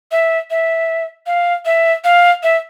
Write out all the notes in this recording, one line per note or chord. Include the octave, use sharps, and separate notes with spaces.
E5
E5
F5
E5
F5
E5